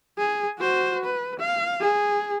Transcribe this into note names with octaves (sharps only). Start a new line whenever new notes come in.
G#4
F#4 C5
B4
F5
G#4